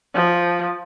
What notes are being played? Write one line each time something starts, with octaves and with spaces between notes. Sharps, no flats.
F3